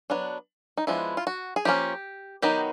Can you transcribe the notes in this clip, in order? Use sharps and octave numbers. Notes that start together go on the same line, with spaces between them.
F#3 B3 D4
D#4
F3 G#3 B3 D4 E4
F4
F#4
G#4
F3 A#3 C#4 G4
D#3 F#3 B3 D#4 G4